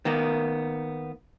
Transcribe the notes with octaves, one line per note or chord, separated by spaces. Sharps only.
D#3 A#3 B3